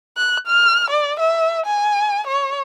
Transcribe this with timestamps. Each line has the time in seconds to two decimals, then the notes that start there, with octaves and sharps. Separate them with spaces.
0.17 F#6
0.47 F6
0.90 D5
1.20 E5
1.66 G#5
2.27 C#5